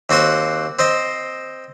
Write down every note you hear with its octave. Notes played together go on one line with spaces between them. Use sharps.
D#2 C4 F#4 F#5 C6
C4 C5 D#5